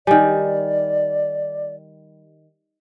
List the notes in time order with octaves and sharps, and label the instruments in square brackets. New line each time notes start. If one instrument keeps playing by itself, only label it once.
[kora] D#3 G3 [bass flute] D5 [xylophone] G#5